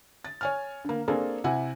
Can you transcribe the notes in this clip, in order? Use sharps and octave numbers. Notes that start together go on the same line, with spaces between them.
A6
C#5 G#5 F6
D3 A#3
A#3 C4 D4 G#4 A4
C3 E4 F#5 G#5